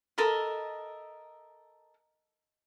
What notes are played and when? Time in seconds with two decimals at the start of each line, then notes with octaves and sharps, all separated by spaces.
0.18 A4 A#4 D#5 E5